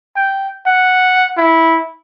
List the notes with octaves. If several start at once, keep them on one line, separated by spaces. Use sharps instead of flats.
G5
F#5
E4